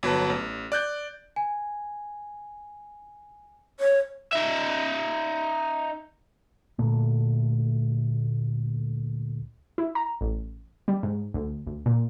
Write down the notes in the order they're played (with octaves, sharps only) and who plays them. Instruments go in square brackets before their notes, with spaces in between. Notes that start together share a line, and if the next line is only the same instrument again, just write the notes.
[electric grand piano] G1 F#3 B4 A5
A1
D5 F#6 G6
[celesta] G#5
[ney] C#5
[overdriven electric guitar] D#4 E5
[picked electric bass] D2 A#2 A3
[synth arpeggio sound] E4
A#5
A1
G3
G#2
D2
D2
A#2